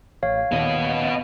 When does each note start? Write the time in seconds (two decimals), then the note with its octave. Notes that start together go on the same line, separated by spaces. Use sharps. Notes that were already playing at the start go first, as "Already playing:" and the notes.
0.23 A1 C#5 F5
0.52 D#2 A#2 B3 D#5